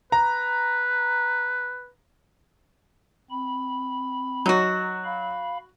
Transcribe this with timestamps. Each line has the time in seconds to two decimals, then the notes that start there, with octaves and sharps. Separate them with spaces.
0.12 B4 A#5
3.31 C4 B5
4.46 F#3 D#4 F#4
5.04 F5 B5